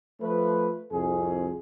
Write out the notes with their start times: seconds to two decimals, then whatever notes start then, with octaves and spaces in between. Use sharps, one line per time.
0.20 F3 A3 B4
0.91 C2 F2 G#4